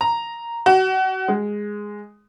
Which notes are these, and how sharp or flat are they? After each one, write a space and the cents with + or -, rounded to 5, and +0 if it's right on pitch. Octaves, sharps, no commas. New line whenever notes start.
A#5 +0
F#4 +30
G#3 -5